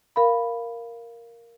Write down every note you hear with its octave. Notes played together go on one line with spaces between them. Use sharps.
A#4 F5 B5